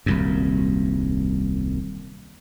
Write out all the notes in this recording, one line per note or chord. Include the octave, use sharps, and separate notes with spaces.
D#1 C2 F#2